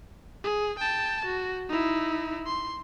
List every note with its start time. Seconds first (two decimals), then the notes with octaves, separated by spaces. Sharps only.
0.44 G#4
0.79 G5 A5
1.25 F#4
1.69 D#4 E4
2.47 C6